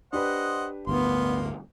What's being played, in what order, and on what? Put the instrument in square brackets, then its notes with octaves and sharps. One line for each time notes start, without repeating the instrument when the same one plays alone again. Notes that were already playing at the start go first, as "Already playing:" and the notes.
[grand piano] D4 G4 B4 [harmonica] C5 D#5 F#5
[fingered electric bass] G1 D2 A2 [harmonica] A#3 C6 [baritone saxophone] B3